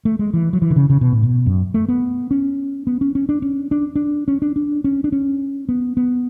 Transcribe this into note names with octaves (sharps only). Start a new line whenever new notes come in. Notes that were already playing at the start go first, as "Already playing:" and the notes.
A3
G#3
E3
F#3
E3
D3
C#3
C#3
B2
A2
B2
F#2
A3
B3
C#4
B3
C#4
C#4
D4
C#4
D4
D4
C#4
D4
D4
C#4
D4
C#4
B3
B3